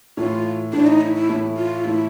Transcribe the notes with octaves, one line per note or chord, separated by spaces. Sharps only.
A2 E3 A3 F4
A2 E3 A3 D4
D#4
E4
E4
A2 E3 A3
F4
A2 E3 A3 E4